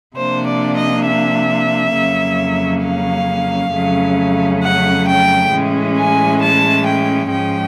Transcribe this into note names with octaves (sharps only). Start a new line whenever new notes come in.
C3 F3 A#3 D4 C5
D5
D#5
E5
F2 C#3 F#3 A#3 C#4
F5
F2 C#3 F#3 A3 C#4
F#5
G5
A2 E3 G#3 C#4
G#5
A5
G5
G#2 F3 G#3 C#4 G5